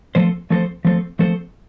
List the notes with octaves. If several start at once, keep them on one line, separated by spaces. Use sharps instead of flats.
F3 A3 C4 A4 C5
F3 A3 C4 A4 C5
F3 A3 C4 A4 C5
F3 A3 C4 A4 C5